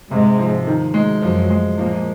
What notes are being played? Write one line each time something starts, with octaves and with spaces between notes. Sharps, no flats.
G#2 C3 G#3
F3
D#3
G#3
F#2 F3 F#3
G#3
A#2 F3 A#3